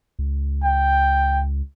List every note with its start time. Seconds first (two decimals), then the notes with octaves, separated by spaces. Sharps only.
0.19 C#2
0.64 G5